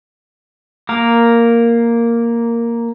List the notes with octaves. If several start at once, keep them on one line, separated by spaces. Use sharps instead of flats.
A#3 A#4